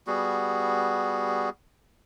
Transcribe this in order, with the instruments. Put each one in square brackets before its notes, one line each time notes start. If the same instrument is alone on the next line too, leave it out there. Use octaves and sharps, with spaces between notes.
[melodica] G3 B3 F#4 G#4